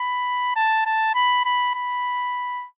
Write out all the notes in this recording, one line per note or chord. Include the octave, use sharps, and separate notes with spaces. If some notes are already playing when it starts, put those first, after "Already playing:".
Already playing: B5
A5
A5
B5
B5
B5